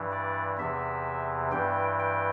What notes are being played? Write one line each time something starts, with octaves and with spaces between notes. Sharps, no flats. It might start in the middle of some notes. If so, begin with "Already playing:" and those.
Already playing: G2 E3
D5
E2 C3 E3 E5
G2 E3 G5
G5